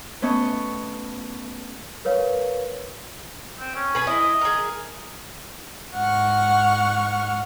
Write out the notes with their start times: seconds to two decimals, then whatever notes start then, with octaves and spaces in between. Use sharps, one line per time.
0.22 A3 B3 C#4 D#5 C#6
2.05 A#4 B4 C#5 F5
3.60 C4
3.75 C#4
3.95 G#4 B4
4.07 E4 D#5
4.41 G#4 A#4
5.93 G#2 F#5 C#6 F6